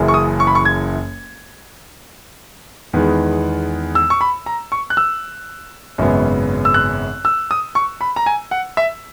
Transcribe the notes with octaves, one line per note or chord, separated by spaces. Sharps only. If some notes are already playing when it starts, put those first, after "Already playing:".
Already playing: F#1 F#2 C#3 E3
C#6
D#6
C#6
B5
C#6
G#6
E2 D#3 G#3 B3
E6
C#6
B5
A#5
C#6
F#6
E6
G#1 F#2 C#3 G#3 B3
E6
F#6
E6
D#6
C#6
B5
A#5
G#5
F#5
E5